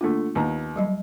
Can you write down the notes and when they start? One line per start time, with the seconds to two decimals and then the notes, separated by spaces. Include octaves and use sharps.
0.01 D3 A3 A#3 F4
0.35 D#2 B3 A#5
0.76 F#3 G3 D#5